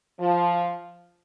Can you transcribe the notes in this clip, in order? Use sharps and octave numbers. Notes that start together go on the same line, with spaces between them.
F3